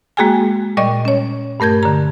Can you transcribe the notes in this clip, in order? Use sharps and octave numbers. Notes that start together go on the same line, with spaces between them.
G#3 A#3 F#4 G#4 G5 G#5
A#2 G3 D5 D#5 C#6
C#4 C#5
G2 A3 A#4 G6 G#6
D3 A#5